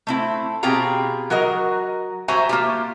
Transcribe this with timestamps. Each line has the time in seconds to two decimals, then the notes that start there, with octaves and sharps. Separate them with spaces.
0.07 A3 C4 E4
0.63 B2 C4 F4 G4 G#4 A#5
1.30 F#3 F#4 A#4 D#5
2.28 G3 F#4 C5 E5 G#5 A#5
2.49 A#3 F4 G4